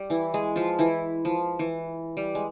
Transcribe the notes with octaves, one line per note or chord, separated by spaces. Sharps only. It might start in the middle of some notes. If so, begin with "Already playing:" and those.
Already playing: G3
E3 E4
G#3 G#4
F3 F4
E3 E4
F3
E3
G3
G#3